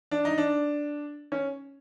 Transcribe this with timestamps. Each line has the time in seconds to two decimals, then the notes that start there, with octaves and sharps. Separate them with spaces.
0.11 D4
0.25 D#4
0.38 D4
1.32 C#4